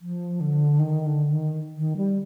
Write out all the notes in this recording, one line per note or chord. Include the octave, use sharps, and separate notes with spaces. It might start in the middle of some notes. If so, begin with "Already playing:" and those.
F3
D3
D#3
D3
D#3
D#3
G3